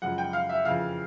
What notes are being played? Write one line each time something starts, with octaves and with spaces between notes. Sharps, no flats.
F#2 C#3 F3 G#3 F#5
G5
F5
E5
F2 C#3 E3 F5